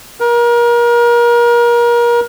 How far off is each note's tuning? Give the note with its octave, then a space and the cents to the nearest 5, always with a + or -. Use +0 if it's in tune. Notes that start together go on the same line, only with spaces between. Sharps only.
A#4 +30